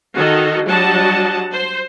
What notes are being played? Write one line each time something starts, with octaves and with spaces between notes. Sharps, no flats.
D#3 F#4 A4 D#5
F#3 G3 D4 D#5 F#5 A5
C5